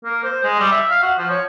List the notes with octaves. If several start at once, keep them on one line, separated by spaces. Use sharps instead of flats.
A#3
C5
G#3
G3
E5
F5
F#4
F3
C#5